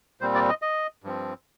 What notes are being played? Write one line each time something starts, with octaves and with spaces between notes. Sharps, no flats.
A#2 G3 C4 C5
D5
D#5
D#5
G2 F3 C4